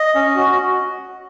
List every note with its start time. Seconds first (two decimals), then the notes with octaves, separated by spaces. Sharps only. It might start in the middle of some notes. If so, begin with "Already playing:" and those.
Already playing: D#5
0.15 C#4
0.36 F#4